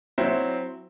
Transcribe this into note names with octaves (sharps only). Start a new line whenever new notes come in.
F#3 C4 E4